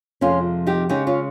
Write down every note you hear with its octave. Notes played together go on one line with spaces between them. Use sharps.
F2 C3 F3 G#3 C#4 F4
D#4 G4
C#3 G#3 C#4 D#4 G4
C#4 F4